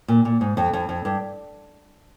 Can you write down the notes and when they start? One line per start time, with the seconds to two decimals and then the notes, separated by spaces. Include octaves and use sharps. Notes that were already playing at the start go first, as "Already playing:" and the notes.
0.08 A#2
0.25 A#2
0.41 G#2
0.57 F2
0.73 F2
0.89 F2
1.05 G2